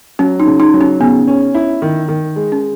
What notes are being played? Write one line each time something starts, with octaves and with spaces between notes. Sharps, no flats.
F#3 C#4
D#4
C#3
D#4
F#3
C#4
C#3 B3
C#4
E4
D#3
D#3
G#3
C#4